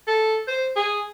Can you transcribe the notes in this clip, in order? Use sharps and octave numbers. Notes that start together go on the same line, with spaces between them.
A4
C5
G#4